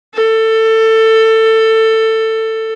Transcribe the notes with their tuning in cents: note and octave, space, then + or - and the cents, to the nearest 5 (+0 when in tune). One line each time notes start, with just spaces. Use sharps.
A4 +20